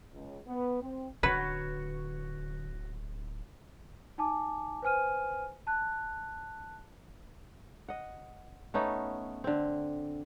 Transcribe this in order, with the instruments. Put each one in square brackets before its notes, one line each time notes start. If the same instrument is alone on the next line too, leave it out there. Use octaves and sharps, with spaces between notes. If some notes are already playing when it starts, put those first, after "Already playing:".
[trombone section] C#2
B3
C4
[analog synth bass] D1 [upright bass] D3 [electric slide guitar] F#4 C#5 [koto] B4
[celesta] D#4 G#5 A5 D6
B4 C5 G#5 F6 D#7
A5 F#6
[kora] D#5 F#5
A3 B3 C#4 D#4
D3 C4